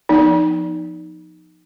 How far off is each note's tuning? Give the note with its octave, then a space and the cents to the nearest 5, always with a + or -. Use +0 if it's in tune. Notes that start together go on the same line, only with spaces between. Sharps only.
F3 +0 B3 +0 D#4 +0